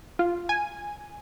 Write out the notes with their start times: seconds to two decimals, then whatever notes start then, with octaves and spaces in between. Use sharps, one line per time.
0.19 F4
0.49 G#5